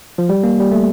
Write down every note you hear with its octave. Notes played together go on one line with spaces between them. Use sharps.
F3
G3
A#3
G3
A3